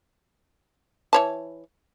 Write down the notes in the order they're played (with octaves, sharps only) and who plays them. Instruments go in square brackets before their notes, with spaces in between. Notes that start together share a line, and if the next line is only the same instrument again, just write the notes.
[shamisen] E3 C#5 A5